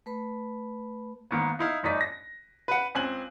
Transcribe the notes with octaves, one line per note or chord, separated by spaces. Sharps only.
A3 B4 B5
G#2 D#3 A#3 B3
D#4 E4 F5
G1 A2 D#4 D5 D#5 B6
A#6
B4 F#5
C#2 C4 G#5 F#6 F#7